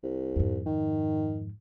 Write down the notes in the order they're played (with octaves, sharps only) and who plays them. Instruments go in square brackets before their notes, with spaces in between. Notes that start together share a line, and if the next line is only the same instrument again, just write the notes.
[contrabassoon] C2
[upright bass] F2 G#2
[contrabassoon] D#3